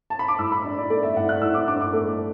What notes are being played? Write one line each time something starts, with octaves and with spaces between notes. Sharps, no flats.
A5
B5
D6
A2 E6
B5
D4 D5
D5
A3 D5
E5
A2 F#5
F#6
A2 E6
D6
D4 D6
D6
A3